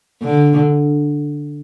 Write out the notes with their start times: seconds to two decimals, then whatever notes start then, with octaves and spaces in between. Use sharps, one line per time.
0.21 D3